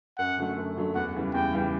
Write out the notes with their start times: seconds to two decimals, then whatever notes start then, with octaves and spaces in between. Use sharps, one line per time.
0.18 F#2 F#5
0.38 D3 F#3 A3
0.58 F#2
0.77 D3 F#3 A3
0.95 E2 F#5
1.15 C#3 E3 G3
1.34 E2 G5
1.53 C#3 E3 G3